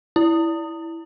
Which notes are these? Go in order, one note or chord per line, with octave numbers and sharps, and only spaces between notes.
E4